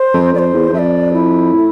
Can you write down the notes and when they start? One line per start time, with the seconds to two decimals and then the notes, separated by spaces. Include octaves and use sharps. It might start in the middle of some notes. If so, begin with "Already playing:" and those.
Already playing: C5
0.14 F2
0.34 F2 D5
0.39 C5
0.54 E2
0.69 E2
0.73 F2 E5
0.79 D5
1.14 E4
1.54 A2